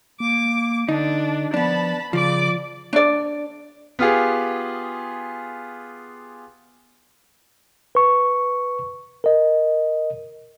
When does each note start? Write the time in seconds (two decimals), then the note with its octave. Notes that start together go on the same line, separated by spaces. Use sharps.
0.20 A#3 D6
0.89 D3 D4 D#4
1.54 F3 B3 D4 A5 B5
2.13 C#3 F3 D5 D6
2.93 D4 D5
3.99 B3 F4 G4 G#4
7.95 B4 C#6
9.24 A#4 D#5